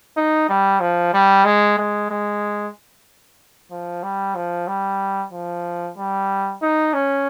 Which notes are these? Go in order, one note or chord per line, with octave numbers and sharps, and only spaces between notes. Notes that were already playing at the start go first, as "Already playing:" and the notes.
D#4
G3
F3
G3
G#3
G#3
G#3
F3
G3
F3
G3
F3
G3
D#4
C#4